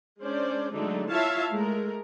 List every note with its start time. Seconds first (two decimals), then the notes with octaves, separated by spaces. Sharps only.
0.20 G#3 C#4 D4 C5 D5
0.73 D3 F#3 G#3 A3 D4 D#4
1.10 E4 F4 C#5 E5 F5 A5
1.52 G#3 A3 A#4